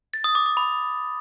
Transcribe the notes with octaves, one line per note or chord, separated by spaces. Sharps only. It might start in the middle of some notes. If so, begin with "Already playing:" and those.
A6
D#6
D6
D6
B5